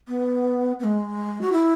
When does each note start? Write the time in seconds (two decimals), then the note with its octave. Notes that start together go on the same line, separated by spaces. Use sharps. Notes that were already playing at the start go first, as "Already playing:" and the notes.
0.08 B3
0.79 B3
0.84 G#3
1.41 F#4
1.52 E4